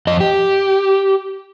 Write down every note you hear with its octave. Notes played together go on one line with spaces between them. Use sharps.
F2 D#5
G4